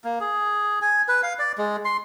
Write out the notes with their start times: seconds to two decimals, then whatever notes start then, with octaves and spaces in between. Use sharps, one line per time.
0.04 A#3
0.20 G#4
0.82 G#5
1.08 B4
1.23 F5
1.39 D5
1.58 G#3
1.85 C6